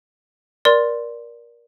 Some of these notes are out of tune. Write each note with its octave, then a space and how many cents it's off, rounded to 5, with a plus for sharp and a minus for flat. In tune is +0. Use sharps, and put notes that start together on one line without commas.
A#4 +25 D5 +0 C6 +0